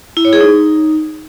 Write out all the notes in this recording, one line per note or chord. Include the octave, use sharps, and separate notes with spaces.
E4
C#5
G#4
D#4